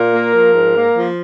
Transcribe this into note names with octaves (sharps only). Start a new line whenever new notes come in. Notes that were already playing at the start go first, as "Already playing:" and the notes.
Already playing: A#2 A#4
A#3
F3
G#2
A#3
F3